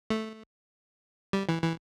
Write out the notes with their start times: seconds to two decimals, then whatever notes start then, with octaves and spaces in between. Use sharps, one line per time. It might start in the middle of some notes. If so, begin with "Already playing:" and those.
0.10 A3
1.33 G3
1.49 E3
1.63 E3